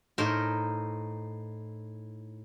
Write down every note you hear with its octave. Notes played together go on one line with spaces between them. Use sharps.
A2 D#4 A#4 C5